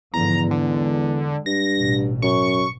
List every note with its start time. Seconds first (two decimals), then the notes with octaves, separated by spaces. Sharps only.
0.14 E2 G#2 D3 F3 A#5
0.51 D3 G#3
1.46 G2 A#6
1.78 A1 B2
2.22 F#2 C#6